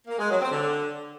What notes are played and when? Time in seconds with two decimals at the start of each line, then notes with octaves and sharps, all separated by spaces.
0.07 A#3
0.18 G#3
0.29 F#3
0.40 C4
0.51 D3